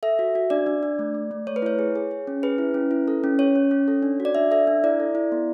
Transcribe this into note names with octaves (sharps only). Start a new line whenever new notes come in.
A4 E5
F#4
F#4
D4 D5
D4
D4
A3
A3
A3
A3 C#5
B4
E4 C#5
G#4
G#4
G#4
C#4
G#4 B4
E4
C#4
E4
A4
C#4
C#4 C#5
C#4
C#4
A4
D4
F#4
D5
D4 E5
A4 E5
D4
E4 D5
A4
E4
B3